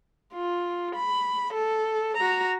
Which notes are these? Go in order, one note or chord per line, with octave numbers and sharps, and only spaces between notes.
F4
B5
A4
F#4 A#5